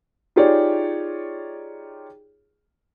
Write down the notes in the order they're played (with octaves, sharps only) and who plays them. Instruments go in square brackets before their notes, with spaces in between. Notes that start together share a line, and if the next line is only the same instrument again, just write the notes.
[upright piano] D#4 F4 G4 G#4 C#5 D5